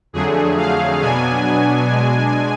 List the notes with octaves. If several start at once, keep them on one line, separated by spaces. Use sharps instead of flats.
F2 D3 F#3 A3 G#4
F5
B2 F#3 B3 D4 G#5
B2 G#3 D4